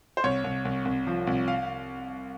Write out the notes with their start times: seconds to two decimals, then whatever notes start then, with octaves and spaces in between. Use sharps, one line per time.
0.17 C5
0.24 C2 C#5
0.44 C2
0.65 C2
0.85 C2
1.07 F3
1.27 C2
1.48 F5